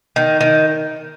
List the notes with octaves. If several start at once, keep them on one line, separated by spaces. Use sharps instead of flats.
D#3
D#3